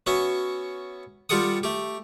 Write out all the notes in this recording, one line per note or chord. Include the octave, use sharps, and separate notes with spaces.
B3 C#4 F#4 E5
G3 F4 G4 A4 F#5 D#6
A3 G4